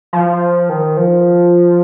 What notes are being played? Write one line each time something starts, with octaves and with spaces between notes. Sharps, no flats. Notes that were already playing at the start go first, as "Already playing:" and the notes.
F3
D#3
F3